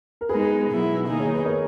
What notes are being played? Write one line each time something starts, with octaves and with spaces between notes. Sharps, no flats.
A#4
G#3 B3 D#4 G#4 B4
B2 F#3 B3 E4
D#3 A#3 D#4 G#4
C#5
B4
A#4 C#5